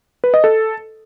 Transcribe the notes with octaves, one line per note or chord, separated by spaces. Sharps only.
B4
D#5
A4